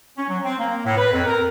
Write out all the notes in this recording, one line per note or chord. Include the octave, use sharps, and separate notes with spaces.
C#4
F#3
C4
A#3
A2
B4
F2
A#4